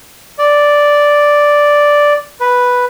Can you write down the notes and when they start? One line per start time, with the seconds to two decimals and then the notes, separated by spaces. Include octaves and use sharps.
0.39 D5
2.40 B4